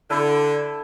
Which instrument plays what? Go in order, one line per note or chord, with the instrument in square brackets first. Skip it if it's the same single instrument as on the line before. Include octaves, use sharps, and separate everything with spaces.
[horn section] D3 [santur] E4 A4